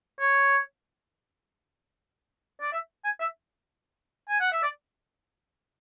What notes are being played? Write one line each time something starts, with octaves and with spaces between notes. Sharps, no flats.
C#5
D5
E5
G#5
E5
G#5
F#5
E5
D5